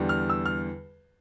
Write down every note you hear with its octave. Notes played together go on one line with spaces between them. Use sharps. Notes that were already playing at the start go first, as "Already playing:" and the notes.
Already playing: E2 D3 G3
F6
E6
F6